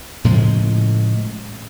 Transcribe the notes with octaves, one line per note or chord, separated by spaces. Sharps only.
A2 C#3 F3 G#3